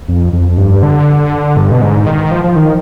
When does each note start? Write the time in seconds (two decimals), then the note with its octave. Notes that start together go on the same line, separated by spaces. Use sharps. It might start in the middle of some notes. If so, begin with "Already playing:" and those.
0.08 F2
0.33 F2
0.58 G2
0.83 D3
1.57 G2
1.71 B2
1.81 G#2
2.06 D#3
2.31 F3
2.44 F3
2.56 D#3